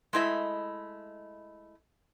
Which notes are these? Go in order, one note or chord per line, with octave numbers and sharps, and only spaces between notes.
G#3 A3 E4 D#5 E5